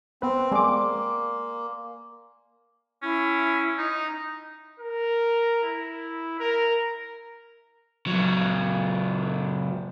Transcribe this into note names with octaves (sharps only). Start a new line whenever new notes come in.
B3 C4 B4
G#3 A#3 D5 G#5 C6 D6
C#4 E4
D#4
A#4
E4
A#4
C#2 F#3